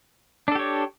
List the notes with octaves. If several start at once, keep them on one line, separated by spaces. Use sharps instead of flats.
D4 G4 A4 C#5